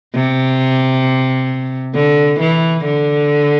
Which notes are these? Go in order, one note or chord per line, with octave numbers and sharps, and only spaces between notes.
C3
D3
E3
D3